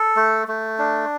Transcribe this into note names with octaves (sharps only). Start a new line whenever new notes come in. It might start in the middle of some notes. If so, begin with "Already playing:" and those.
Already playing: A4
A3
A3
D4